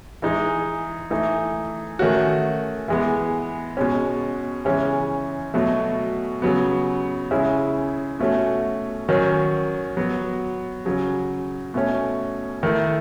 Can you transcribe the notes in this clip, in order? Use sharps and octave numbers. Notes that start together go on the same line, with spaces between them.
E3 G#3 D#4
E3 A3 D#4
D#3 A3 C#4 F#4
E3 G#3 B3
B2 G#3 C#4
C#3 E3 G#3 C#4
B2 F#3 A3
C#3 F#3 B3
C#3 G#3 C#4 E4
B2 A3 C#4 F#4
D#3 F#3 C#4
F#3 B3 F#4
C#3 F#3 C#4
B2 A3 C#4
D#3 A3 E4